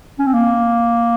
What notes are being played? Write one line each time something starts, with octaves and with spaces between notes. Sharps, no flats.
C#4
C4
A#3